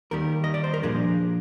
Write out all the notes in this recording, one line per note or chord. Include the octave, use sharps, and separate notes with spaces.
D#2 D#3 G3 A#4
D#5
D5
C5
A#4
A#2 F3 A#3 D4 G#4